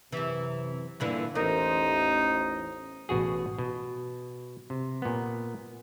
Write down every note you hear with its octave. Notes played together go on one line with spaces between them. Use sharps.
F#2 C3 E3
G2 A#2 D3 E3 D4 F4
A1 E2 D#4 A#4 C5
A1 B2 F#4 G#4
B2
C3
A#2 B3